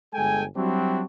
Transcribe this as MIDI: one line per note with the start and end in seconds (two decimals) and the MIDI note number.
0.13 0.44 31
0.13 0.44 56
0.13 0.44 69
0.13 0.44 79
0.13 0.44 80
0.55 1.02 54
0.55 1.02 55
0.55 1.02 60
0.55 1.02 62
0.55 1.02 64
0.55 1.02 66